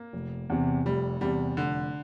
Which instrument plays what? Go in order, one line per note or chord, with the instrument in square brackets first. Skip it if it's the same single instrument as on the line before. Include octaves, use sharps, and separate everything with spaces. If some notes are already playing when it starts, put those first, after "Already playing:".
Already playing: [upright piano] A#3
[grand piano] F1
E2 C3
[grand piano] F1 [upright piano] G3
[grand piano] E2 C3 [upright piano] G3
[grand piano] F1 [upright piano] D3